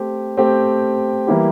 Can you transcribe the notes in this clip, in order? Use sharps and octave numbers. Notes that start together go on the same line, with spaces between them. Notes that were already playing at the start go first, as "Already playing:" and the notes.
Already playing: A3 C4 G4
A3 C4 G4
E3 G3 A#3 E4 G4